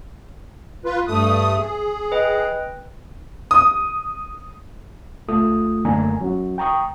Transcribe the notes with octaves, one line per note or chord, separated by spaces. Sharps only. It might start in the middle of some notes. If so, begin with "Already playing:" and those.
F4 B4
G2 A3 D#6
G#4
B4 D#5 G5
D#6
C#2 A3 F4 D#6
F#2 D3 A3 A#3 G#5 A#5
F#3 C#4 F#4
G5 A#5 C#6 D#6